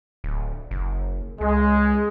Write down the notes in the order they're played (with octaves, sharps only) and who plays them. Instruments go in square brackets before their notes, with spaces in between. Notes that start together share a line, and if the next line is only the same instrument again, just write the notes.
[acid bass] D1
F#1
[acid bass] C#2 [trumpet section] G#3